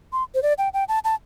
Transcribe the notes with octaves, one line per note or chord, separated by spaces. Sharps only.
C6
C5
D5
G5
G5
A5
A5